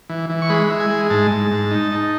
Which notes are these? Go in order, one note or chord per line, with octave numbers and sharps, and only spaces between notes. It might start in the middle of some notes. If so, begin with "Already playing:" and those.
E3
E3
C#6
G#3 B5
E4
G#5
G#3
G#2 A5
G#2
G#2
D#4
D#4